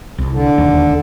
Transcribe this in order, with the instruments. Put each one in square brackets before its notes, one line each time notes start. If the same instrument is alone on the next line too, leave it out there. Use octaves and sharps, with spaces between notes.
[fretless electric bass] C2
[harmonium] D3
[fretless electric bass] E1 D#2